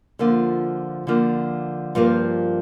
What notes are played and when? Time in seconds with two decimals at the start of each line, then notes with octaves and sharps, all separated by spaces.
0.19 D3 F3 A#3 F4
1.07 D3 F3 A#3 F4
1.95 G2 F3 A#3 F4 A#4